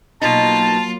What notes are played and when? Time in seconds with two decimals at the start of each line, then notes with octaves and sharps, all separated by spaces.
0.21 B2 F#3 A#3 D#4 F4 A5